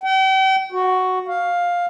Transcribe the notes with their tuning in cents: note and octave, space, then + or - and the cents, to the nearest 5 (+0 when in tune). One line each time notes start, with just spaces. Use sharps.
G5 -40
F#4 +5
F5 +10